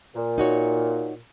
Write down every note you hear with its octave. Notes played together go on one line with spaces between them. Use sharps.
A#2
D#4 F#4 C#5